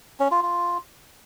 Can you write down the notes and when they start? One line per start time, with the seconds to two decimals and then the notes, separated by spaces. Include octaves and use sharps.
0.20 C#4
0.31 F4
0.43 F4